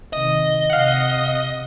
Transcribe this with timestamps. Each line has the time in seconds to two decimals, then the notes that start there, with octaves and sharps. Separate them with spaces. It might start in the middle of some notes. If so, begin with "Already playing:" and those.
0.13 C3 D#3 D#5
0.70 C3 F5 F#5